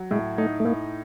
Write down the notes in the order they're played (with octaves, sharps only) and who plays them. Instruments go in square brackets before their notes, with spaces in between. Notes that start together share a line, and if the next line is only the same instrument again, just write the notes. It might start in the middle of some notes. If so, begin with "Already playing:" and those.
Already playing: [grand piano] F#3
[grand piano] A2 [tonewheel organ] G#3
[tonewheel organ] A3 [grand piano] D#4
[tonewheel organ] A3
[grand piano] A2 [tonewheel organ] A#3